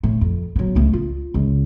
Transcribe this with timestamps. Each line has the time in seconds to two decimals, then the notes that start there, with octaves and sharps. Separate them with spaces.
0.03 A2
0.21 F2
0.56 F#3 B3
0.75 C#2 A3
0.93 F4
1.34 C#2